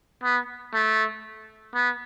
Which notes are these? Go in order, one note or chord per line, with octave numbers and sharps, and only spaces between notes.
B3
A3
B3